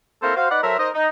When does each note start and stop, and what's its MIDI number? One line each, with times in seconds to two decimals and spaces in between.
0.22 0.34 58
0.22 0.34 60
0.22 0.34 64
0.22 0.34 69
0.22 0.34 70
0.22 0.34 72
0.36 0.46 66
0.36 0.46 72
0.36 0.46 77
0.50 0.58 63
0.50 0.58 71
0.50 0.58 74
0.50 0.58 78
0.63 0.73 54
0.63 0.73 69
0.63 0.73 70
0.63 0.73 72
0.63 0.73 76
0.78 0.89 63
0.78 0.89 70
0.78 0.89 72
0.78 0.89 75
0.94 1.08 63